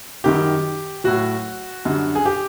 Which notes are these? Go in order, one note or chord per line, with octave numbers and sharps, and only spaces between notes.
F#2 D#3 G3 G4
A2 F#3 F#4
F#2 D3 G3
G#4
G4